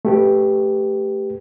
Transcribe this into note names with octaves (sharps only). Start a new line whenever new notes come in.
A3 G4 B4